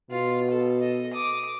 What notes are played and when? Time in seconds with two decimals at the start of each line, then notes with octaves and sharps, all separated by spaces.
0.11 B2 F4
0.50 A4
0.81 A4 D#5
1.13 D6 D#6